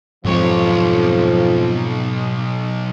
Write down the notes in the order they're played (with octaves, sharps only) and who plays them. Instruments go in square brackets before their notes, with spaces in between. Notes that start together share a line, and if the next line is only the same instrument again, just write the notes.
[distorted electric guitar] B1 C#5 [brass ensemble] F2 F3 [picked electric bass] G#2 G3